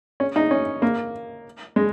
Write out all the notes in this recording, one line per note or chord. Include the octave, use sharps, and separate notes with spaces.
C#4
D#4
C#4
A#3
G#3